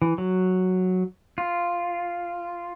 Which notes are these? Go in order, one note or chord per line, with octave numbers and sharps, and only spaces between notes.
E3
F#3
F4